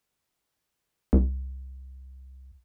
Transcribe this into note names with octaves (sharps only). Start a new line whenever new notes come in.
C2